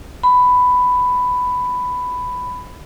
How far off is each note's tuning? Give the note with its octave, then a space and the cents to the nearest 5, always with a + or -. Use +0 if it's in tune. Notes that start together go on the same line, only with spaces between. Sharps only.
B5 +10